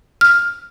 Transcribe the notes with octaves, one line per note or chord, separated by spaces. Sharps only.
F6